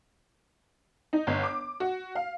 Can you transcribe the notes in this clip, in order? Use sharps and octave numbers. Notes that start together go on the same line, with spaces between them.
D#4
G1
D6
F#4
F5